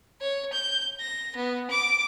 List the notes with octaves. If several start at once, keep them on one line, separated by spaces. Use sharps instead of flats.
C#5
G6
A#6
B3
D6